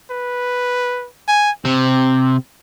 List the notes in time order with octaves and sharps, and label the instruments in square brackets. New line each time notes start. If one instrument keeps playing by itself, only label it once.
[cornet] B4
G#5
[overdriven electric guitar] C3 [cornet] C4